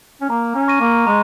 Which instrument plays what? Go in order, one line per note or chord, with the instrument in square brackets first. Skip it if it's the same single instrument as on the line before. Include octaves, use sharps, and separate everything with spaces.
[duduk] C#4
[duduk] A#3 [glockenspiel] A#5
[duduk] C#4
[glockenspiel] C#6 A#6 D#7
[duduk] A#3
[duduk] G#3 [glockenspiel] A#5